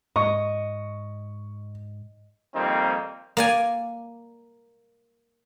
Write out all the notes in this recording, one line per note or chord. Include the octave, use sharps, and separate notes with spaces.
G#2 D#5 C#6
F2 D#3 G3 A#3 C4 D#4
A#3 D5 G#5